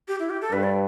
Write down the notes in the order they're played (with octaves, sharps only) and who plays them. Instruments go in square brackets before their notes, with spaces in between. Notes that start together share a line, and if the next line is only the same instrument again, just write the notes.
[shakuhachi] G4
E4
G4
A4
[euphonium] G2 [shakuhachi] B4
[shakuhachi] D5